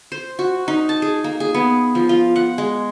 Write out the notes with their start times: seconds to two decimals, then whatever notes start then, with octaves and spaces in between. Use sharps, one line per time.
0.12 C5
0.39 F#4
0.68 D#4
0.89 A5
1.02 G#4
1.24 A#3
1.40 G#4
1.54 B3
1.95 F3
2.09 F4
2.36 F#5
2.58 G#3